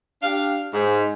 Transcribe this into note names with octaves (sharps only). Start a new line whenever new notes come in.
D4 G4 F5
G#2